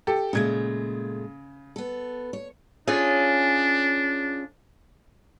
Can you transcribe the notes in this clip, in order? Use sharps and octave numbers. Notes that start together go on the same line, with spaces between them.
G4 A4
A#2 C#3 G#3 A3 G#6
B3 A4
C#5
C#4 D4 F4 G#4